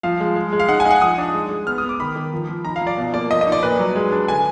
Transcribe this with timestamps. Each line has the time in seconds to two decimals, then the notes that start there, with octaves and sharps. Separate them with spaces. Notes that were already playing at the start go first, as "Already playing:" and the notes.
0.03 F3 F5
0.20 G#3
0.36 G#3
0.53 G#3
0.59 F5
0.69 D#4 F#5
0.80 G#5
0.85 D#4
0.91 F#5
1.02 F3 D#6
1.18 D4
1.34 G#3
1.50 G#3
1.67 B3 F6
1.78 D#6
1.83 B3
1.89 D6
2.00 D#3 B5
2.16 D#3
2.33 F3
2.49 F3
2.65 D#4 A#5
2.76 F5
2.81 F3
2.87 D5
2.97 B2
3.14 A#3 D5
3.30 F3 D#5
3.41 D#5
3.47 D#4
3.52 D5
3.63 A#2 B4
3.79 F#3
3.96 G#3
4.12 D4
4.28 D3 G#5